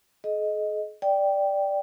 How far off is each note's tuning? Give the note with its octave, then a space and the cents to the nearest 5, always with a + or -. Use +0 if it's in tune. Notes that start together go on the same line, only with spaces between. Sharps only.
G#4 +45 D#5 +0
D5 +0 G5 +0